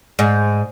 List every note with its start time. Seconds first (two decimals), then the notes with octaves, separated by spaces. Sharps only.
0.19 G#2